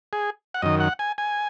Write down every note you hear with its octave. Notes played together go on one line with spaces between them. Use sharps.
G#4
F#5
F#2 D#3 D#5
F#5
G#5
G#5